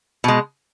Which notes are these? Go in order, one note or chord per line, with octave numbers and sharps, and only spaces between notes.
B2 G#3